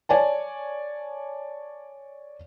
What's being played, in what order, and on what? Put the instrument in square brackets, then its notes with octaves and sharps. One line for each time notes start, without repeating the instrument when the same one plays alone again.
[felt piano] C#5 D5 G#5 A5